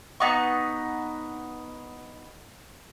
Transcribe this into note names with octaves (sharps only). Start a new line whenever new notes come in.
B3 D#4 F#4 C#6